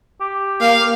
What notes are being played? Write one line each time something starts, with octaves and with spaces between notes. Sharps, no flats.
G4
A#3 F5